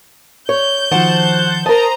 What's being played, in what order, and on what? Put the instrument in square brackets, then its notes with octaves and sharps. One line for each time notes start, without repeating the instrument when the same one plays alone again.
[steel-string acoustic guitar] C#5 [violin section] G6
[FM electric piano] D#3 F3 [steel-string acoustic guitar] F#4 [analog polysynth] C5 F#5 A5
[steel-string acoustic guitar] A#4 A5 [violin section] C5 A#5 [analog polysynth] D#6